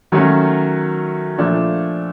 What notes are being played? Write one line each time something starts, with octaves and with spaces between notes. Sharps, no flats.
D#3 F#3 A3 C#4 F#4
A#2 F3 A3 D4